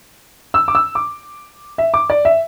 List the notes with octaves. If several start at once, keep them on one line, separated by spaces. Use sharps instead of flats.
E6
D6
E6
D6
E5
D6
D5
E5